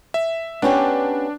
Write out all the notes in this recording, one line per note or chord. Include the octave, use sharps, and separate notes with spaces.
E5
B3 C#4 D4 G4